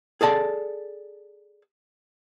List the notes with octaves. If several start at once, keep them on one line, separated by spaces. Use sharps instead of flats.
G#4 A4 D5 A5